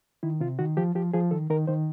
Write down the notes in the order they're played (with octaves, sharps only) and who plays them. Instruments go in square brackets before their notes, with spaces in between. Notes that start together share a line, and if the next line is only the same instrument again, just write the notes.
[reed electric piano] D#3 E4
C3 F4
D#3 F#4
F3 G4
F3 G4
F3 G#4
D#3 A4
D#3 A#4
D#3 C5